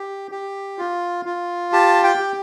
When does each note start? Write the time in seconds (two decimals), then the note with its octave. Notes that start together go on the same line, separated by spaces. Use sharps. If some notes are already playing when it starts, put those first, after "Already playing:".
Already playing: G4
0.31 G4
0.78 F4
1.25 F4
1.73 G4 A5
2.04 G5
2.20 G4